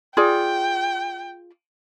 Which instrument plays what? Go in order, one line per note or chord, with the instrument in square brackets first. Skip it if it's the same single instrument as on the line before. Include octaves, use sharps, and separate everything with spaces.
[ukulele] F4 G#4 D5 [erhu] G5